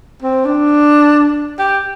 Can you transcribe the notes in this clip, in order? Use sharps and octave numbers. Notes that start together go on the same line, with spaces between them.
C4
D4
G4